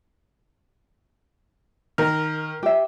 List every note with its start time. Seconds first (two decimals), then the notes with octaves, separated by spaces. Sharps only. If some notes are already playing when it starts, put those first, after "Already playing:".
1.98 D#3 A#4 F6
2.63 G4 E5